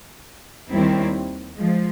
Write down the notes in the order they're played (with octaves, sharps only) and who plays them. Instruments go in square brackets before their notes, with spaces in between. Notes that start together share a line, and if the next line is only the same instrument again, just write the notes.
[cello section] D#2 D#3 G3 C4 E4
F3 G#3